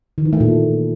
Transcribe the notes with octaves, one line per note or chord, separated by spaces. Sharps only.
D#3
E3
A3
A#2